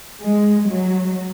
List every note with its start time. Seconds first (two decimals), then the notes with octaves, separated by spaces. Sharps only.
0.21 G#3
0.67 F#3